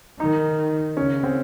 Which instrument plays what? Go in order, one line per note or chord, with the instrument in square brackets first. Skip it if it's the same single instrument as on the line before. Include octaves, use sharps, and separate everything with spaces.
[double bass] D#3 [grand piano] D#4
[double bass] C#3 [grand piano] C#4
[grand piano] C4